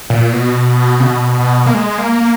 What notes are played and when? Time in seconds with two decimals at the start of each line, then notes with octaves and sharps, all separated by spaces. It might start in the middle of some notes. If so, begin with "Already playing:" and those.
0.10 A#2
0.33 B2
1.00 C#3
1.04 B2
1.40 B2
1.66 A#3
1.74 G#3
1.98 A#3
2.21 A#3